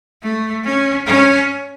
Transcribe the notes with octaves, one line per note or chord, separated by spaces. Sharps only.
A3
C#4
C#4